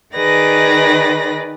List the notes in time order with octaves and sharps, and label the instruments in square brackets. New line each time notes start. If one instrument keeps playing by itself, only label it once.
[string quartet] D#3 G#4 B4 D5 A#6